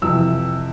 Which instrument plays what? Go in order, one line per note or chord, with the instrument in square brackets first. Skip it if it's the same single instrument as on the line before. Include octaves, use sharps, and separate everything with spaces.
[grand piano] F2 C3 E3 E6